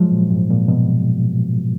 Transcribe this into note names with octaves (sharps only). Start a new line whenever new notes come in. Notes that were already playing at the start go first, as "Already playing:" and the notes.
Already playing: F3 F#3 G#3
A#2
G#2
A#2
B2